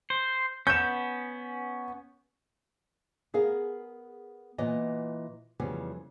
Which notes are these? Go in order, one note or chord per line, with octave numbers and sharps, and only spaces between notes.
C5
B3 C#4 G6 E7
B3 G#4 A#4 F5
A#2 E3 B3 D#5
F2 C#3 E3 G3 B3